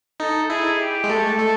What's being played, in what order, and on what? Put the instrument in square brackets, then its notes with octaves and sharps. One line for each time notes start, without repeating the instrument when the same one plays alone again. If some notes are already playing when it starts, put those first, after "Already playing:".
[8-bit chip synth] D#4 [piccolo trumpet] A4
[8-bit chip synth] E4 [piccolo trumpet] G#4
[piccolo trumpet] G4
[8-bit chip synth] G#3
[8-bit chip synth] A3 [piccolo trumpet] A4
[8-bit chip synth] A3